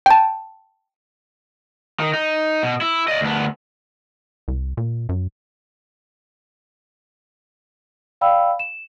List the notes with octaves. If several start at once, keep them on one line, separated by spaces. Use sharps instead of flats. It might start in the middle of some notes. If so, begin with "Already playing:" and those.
G5 A5
D#3
D#4
B2
E4
D5 D#5
D2 B3
C2
A#2
F#2
D5 F5 G5 B5 E6
E7